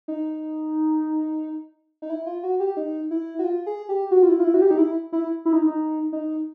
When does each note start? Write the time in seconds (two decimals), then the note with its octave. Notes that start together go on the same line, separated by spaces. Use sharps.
0.08 D#4
2.02 D#4
2.10 E4
2.26 F4
2.43 F#4
2.60 G4
2.77 D#4
3.11 E4
3.39 F#4
3.44 F4
3.66 G#4
3.89 G4
4.11 F#4
4.23 F4
4.28 E4
4.40 F4
4.44 E4
4.54 F#4
4.62 G4
4.71 D#4
4.78 E4
5.13 E4
5.45 E4
5.53 D#4
5.67 D#4
6.13 D#4